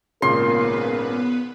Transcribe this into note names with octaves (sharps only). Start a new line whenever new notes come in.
G#1 A#2 C#3 B3 A#4 B4 C6